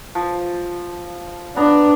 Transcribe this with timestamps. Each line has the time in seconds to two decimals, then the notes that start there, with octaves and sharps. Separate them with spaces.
0.15 F3
1.56 B3 D4 A#5